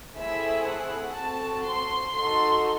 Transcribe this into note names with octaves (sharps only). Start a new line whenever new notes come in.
A3 C4 E4 G#4 E5
F#5
C4 F#4 A4 A5
C6
D#4 F#4 A4 C6